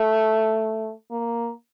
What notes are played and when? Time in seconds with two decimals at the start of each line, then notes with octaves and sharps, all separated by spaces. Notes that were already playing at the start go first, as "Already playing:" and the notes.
Already playing: A3
1.11 A#3